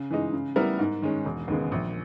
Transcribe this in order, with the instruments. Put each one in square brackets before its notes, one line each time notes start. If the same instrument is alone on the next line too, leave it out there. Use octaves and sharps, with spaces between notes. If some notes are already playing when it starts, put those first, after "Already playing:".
Already playing: [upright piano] C#3
E3 G#3 D#4
C#3
G3 B3 E4 A#4
G#2
D#3 G#3 C#4
E1
D#2 C#3 G#3 B3
A#1